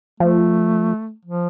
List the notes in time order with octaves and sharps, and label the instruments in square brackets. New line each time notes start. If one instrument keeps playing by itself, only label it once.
[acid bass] F3 [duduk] A3
[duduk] F3